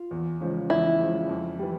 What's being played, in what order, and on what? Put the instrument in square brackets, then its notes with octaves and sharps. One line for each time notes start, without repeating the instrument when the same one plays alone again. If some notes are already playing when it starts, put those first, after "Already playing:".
Already playing: [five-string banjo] F4
[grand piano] E2
C#3 F3 G#3
[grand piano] E2 [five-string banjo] E4
[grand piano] C#3 F3 G#3
F2
E3 G3